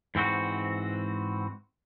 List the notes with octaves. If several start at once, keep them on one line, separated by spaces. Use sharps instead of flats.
G#2 E3 C4 F#4